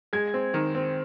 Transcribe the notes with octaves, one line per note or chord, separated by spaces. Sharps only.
G#3 G#6
C4
D#3
C4